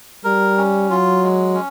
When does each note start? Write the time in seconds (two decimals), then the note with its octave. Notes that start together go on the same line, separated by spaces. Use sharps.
0.24 G3 A#4
0.58 C#4
0.90 F#3 F4
1.23 G#3
1.54 C#4